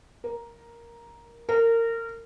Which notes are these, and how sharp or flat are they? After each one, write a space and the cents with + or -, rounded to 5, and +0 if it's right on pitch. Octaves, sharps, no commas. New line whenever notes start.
A#4 +5
A#4 -25